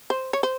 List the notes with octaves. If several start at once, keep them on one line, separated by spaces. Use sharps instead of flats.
C5
C#5
C5